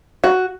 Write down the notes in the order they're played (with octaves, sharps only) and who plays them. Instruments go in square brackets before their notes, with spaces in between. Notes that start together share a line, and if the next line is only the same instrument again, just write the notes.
[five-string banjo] F#4